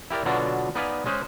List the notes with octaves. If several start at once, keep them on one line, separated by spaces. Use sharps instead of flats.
E4 G4 A#4 D5
B2 D3 F#3 D4 F4 F#4
B3 D#4 B4 D5 F5 G#5
G#3 C#4 G#4 C5